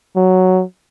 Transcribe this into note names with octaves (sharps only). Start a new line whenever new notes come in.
F#3